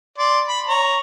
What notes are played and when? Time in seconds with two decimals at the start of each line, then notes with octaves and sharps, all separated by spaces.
0.18 D5 C6
0.47 B5
0.67 C#5 A#5